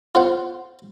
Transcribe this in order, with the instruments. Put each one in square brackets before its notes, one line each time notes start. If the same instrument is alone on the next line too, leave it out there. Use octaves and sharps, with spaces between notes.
[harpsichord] F4 C5 F#5